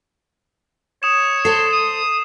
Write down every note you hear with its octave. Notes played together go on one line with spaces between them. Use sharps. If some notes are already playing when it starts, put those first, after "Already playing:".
C#5 D#6 E7
A4 C5 C7
D#6